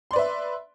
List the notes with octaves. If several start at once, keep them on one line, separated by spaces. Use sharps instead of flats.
B4 D5 E5 C6